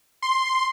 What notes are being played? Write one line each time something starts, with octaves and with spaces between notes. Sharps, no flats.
C6